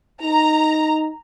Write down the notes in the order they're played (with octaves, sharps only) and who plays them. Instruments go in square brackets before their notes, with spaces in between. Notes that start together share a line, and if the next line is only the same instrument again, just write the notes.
[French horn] D#4 [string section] A#5